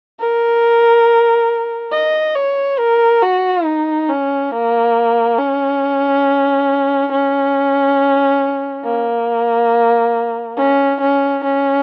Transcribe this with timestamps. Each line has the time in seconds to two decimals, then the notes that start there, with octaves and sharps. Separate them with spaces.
0.20 A#4
1.92 D#5
2.36 C#5
2.79 A#4
3.22 F#4
3.65 D#4
4.09 C#4
4.51 A#3
5.38 C#4
7.12 C#4
8.84 A#3
10.58 C#4
11.00 C#4
11.44 C#4